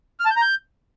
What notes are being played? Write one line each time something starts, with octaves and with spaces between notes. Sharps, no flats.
F6
A5
G6
A#5
G6